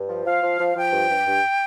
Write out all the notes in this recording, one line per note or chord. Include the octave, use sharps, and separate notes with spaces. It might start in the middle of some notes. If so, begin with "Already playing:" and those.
Already playing: G2
F3
F3 F5
F3
F3
F3 G5
G2
G2
G2